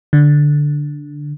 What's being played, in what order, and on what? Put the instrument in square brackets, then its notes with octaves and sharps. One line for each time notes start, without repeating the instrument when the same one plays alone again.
[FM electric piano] D3